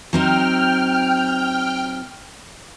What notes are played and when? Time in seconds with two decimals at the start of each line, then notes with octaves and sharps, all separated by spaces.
0.13 F#3 C4 D#4 G5 F6